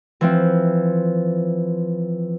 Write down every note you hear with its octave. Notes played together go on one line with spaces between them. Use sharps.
E3 F3 C4